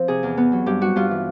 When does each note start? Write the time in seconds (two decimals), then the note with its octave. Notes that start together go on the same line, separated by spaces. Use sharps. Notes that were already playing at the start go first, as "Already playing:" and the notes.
Already playing: F3 C4 C5
0.08 C3 G#4
0.23 E2
0.37 B3
0.52 F#3
0.66 G2 G4
0.81 G3 F#4
0.96 G2 F4
1.11 E3